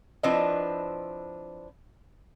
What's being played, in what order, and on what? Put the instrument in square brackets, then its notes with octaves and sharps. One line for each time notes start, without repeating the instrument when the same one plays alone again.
[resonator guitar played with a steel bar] F3 C4 D4 E4 B4 D#5